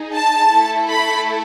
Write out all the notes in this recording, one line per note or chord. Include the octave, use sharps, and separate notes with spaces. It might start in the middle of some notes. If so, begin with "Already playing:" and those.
Already playing: D#4 G#4
A5
A3 E4 A4
B5